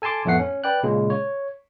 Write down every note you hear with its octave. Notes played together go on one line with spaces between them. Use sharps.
A4 G#5 A5 C6 D6
F2 A2 A3 B3 F#5 C7
C#4
B4 D5 G5 F#6
A#2 C#3 G#3
C#5